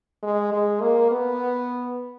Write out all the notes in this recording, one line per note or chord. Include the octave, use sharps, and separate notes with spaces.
G#3
G#3
A#3
B3